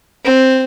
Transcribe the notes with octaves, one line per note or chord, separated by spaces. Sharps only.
C4